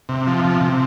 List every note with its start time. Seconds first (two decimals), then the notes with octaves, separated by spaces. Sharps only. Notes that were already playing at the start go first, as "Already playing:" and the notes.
0.09 C3
0.27 F3
0.44 C3
0.61 C3